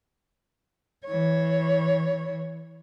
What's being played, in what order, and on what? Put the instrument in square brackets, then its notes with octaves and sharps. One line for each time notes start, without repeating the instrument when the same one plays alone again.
[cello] E3 C#5